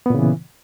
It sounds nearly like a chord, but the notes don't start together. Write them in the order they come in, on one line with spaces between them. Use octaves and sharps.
B3 A#2 C#3 E3